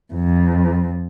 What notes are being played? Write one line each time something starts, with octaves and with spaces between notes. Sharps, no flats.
F2